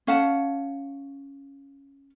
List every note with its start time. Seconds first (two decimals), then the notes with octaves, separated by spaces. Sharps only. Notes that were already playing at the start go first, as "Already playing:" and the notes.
0.07 C#4 F5 F#5 A5